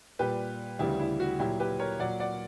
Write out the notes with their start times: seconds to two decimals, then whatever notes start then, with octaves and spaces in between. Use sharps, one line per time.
0.19 A#2 G3 G4 B4
0.79 D2 C#3 E3 G3 E4 G4
0.99 E4
1.20 F#4
1.39 A#2 F#3 E4 G4
1.60 G4 B4
1.80 A#4 C#5
2.00 A#2 F#3 D5 F#5
2.20 D5 F#5